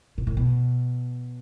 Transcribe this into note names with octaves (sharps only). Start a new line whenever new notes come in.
B2
A2
B2